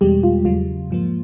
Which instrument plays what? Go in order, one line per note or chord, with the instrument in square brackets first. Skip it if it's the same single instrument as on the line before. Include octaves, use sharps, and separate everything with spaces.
[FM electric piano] E2 B2 G3 G#3 G4
F4
E2 C#3 F#3 F4
G#2 F3 A#3